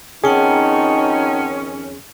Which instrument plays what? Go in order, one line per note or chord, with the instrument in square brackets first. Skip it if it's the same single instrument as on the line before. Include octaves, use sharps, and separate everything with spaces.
[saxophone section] F2 D#3 C#4 [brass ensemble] D#4 [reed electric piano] G#4 [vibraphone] F#5 G5 A5